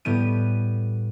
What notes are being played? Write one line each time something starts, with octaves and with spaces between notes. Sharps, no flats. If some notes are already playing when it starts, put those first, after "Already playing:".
A2 G3 B3 D#7